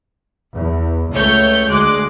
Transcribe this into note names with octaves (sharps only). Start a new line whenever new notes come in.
E2
C#2 A3 C#5 G6
D2 G#3 D6 F#6